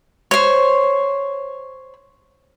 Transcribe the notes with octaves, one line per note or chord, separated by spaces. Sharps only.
C5 C#5